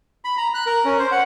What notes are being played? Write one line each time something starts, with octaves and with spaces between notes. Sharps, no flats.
B5
A#5
F#6
A#4
C#4
C5
F#5